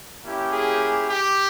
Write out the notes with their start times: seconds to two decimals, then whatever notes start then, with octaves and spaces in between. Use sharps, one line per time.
0.25 A#3 C#4 E4 G4
0.52 G#4
1.08 G4